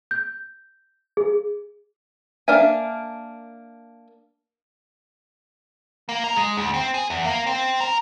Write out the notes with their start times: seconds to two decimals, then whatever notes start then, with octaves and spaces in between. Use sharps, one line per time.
0.11 G6
1.17 G#4
2.48 A#3 D4 A#4 E5 G#5
6.09 A#3
6.24 A#4
6.36 G#3
6.57 D2
6.74 C4
6.94 G#4
7.10 E2
7.25 A#3
7.47 C4
7.81 A#4